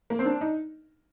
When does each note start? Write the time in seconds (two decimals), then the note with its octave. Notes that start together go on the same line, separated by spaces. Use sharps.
0.10 A#3
0.19 C4
0.25 D4
0.41 D#4